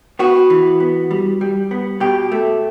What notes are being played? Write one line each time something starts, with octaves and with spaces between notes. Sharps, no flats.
B3 F#4
E3
B3
G3
G3
B3
B2 G4
A3